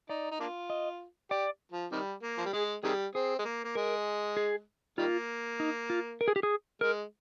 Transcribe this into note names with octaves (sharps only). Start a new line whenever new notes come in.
D#4 D5
D#4
A#3 D4 F4
D#5
G4 D5
F3
C3 D#3 G3
A#3
F3
G3
G#3 G#4
C3 D#3 G3 G#4
C4 G#4
G#3
A#3
A#3
G#3 A#4
G#4
D#3 G3 A#3 F4
D#4
F4
A#4
G#4
G4
G#4
G#3 A#4